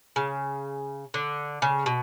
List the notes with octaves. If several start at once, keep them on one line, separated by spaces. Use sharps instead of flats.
C#3
D3
C#3
B2